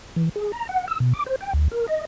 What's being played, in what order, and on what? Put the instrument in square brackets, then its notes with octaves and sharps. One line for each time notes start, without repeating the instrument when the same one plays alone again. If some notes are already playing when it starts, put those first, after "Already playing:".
[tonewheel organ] E3
G#4
A#5
F#5
E6
B2
D6
C5
G5
D2
A#4
D#5